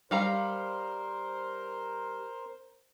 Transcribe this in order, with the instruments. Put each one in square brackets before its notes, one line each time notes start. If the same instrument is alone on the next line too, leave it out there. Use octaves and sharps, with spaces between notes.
[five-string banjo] G3 F5 A#5 [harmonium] A#4 C5